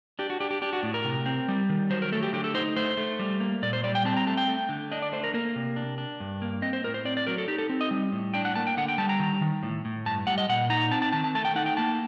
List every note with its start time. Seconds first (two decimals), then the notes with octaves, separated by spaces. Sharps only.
0.19 D4 G4
0.30 F#4
0.40 D4 G4
0.51 G4
0.62 D4 G4
0.73 F#4
0.83 A2
0.94 A#4
1.05 C3
1.26 C4
1.48 G3
1.69 D#3
1.90 F#3 C5
2.02 A#4
2.12 A3 A4
2.22 G4
2.33 D3 G4
2.44 A4
2.54 D#4 C5
2.76 A3 C5
2.97 A3
3.19 G3
3.40 A#3
3.62 A#2 D5
3.73 C5
3.84 G3 D5
3.95 G5
4.05 C4 A5
4.17 A#5
4.27 A3 A5
4.37 G5
4.47 A3
4.69 D3
4.91 D4 D#5
5.02 D5
5.12 A3 C5
5.24 A#4
5.34 A#3 A#4
5.56 C3
5.76 D4
5.98 D4
6.20 G2
6.42 A#3
6.62 C4 D#5
6.73 C5
6.84 A2 A#4
6.94 C5
7.05 C4 D5
7.17 D5
7.27 F#3 A#4
7.38 A4
7.48 D#4 G4
7.59 A4
7.69 C4
7.81 D#5
7.91 G3
8.12 A2
8.34 D4 G5
8.45 F#5
8.55 A#3 A5
8.67 G5
8.77 D3 F#5
8.88 G5
8.98 G3 A5
9.09 A#5
9.20 D#3
9.41 D#3
9.63 A2
9.85 A2
10.06 G2 A5
10.27 G3 F#5
10.38 D#5
10.49 A#2 F#5
10.70 D#4 A#5
10.91 C4 A5
11.02 A5
11.12 D#3 A5
11.24 A5
11.35 A3 A5
11.45 G5
11.56 D#4 F#5
11.66 G5
11.77 A#3 A5